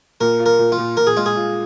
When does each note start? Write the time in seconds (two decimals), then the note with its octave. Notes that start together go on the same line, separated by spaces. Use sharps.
0.21 A#2 A#4
0.39 F4
0.46 A#4
0.59 A#2
0.72 F4
0.78 A#2
0.97 A#2 A#4
1.07 G#4
1.16 G#3 F4
1.26 G#4
1.36 F4